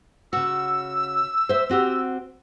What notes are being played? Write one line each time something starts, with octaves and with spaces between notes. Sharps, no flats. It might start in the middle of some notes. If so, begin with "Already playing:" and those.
C#3 F#4 E6
C5 E5
C4 F#4 G4